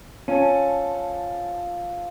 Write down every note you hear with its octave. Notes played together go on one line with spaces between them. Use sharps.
F3 C#4 A4